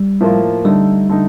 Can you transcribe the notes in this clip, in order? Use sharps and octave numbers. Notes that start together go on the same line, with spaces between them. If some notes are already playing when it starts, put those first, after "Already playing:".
Already playing: G3
A2 F3 A#3 F4
D3 G3 A3 D#4
D3 A3 D#4